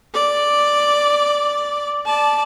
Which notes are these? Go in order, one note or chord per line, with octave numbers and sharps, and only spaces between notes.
D5
D5 A5